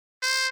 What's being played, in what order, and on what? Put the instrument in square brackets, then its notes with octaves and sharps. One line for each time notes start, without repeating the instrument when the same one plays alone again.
[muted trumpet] C5